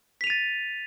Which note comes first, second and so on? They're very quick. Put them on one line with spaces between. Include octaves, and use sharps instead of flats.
B6 F7 D#7 A6